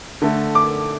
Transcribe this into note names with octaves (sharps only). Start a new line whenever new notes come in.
D3 A3
D6